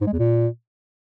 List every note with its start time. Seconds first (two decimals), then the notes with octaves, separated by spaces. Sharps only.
0.01 G#2
0.07 G#3
0.13 E2
0.19 A#2